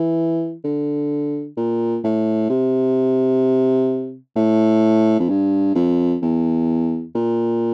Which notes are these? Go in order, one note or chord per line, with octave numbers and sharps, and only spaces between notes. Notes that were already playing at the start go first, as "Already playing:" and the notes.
Already playing: E3
D3
A#2
A2
C3
A2
F2
G2
F2
E2
A#2